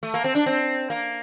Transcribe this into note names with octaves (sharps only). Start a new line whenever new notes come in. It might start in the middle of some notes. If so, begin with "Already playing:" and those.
A3
A#3
C4
D4
C4
A#3